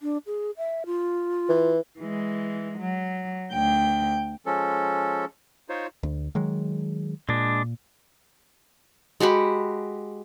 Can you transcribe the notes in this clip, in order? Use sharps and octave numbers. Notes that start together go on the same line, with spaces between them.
D4
G#4
E5
F4
E3
E3 G#3
F#3
D2 G5
F3 G#3 C#4 A4
D#4 F4 C5 C#5
D2
D#3 F#3 G#3
A#2 G#3 D4
G#3 F#4 G4 B5